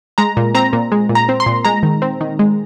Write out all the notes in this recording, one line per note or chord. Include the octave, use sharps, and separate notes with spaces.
G#3 A#5
A#2
C4 A#5
A#2
G#3
A#2
A#5
C4
C6
A#2
G#3 A#5
D#3
C4
D#3
G#3